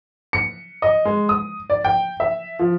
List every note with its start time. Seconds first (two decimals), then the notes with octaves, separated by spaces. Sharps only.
0.33 C#7
0.82 D#5
1.05 G#3
1.29 D#6
1.70 D5
1.85 G5
2.20 E5
2.59 F3